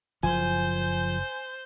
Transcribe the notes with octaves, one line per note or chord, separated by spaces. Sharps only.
F#1 F3 C5 G#5 G6